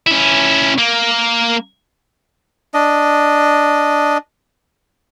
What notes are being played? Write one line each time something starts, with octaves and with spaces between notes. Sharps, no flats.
C#4 E4
A#3
D4 D#5